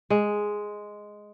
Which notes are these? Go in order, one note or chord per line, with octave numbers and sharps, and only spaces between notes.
G#3